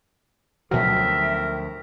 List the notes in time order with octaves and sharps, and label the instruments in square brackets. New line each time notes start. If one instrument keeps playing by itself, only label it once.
[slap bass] D2 F3 [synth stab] B2 F#3 [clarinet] A#4 [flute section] E5 G5